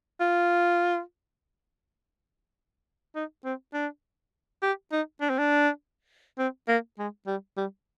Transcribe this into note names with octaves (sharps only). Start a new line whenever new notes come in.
F4
D#4
C4
D4
G4
D#4
D4
C4
D4
C4
A#3
G#3
G3
G3